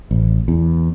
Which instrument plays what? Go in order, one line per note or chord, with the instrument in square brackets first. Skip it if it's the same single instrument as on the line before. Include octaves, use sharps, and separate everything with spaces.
[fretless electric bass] A1
E2